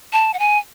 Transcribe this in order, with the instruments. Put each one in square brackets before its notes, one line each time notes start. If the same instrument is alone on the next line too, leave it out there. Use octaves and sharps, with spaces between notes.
[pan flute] A5
F#5
G#5